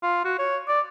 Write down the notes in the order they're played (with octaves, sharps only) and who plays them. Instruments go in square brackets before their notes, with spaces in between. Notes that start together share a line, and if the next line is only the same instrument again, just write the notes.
[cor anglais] F4
F#4
C#5
D5